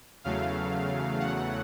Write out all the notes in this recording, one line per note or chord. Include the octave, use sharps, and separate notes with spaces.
E2 C#3 F#3 A3 F5
F#5